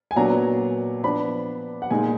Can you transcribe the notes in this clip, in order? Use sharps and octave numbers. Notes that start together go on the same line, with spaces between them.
G#5
A#2 F#3 B3 D4 A#5
F3 B3 D4 B5
F#5
A#2 G#3 D#4 G#5